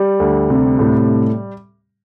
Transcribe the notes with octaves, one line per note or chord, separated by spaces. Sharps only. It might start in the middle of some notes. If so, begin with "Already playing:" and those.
Already playing: G3
D2
C3
A2